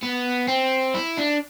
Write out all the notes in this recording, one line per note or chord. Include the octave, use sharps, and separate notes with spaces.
B3
C4
E4
D4